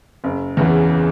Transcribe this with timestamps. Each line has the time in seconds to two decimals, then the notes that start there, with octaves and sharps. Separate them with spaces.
0.24 F#1
0.57 E2 C#3 E3